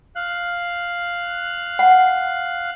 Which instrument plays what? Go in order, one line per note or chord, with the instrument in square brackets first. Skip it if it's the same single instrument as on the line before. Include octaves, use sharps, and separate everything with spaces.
[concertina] F5 F#6
[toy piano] F#5